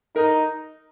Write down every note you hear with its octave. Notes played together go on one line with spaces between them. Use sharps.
D#4 A#4